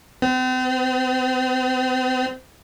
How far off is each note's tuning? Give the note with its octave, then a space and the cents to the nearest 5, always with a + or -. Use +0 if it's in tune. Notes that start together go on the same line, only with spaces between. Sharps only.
C4 -40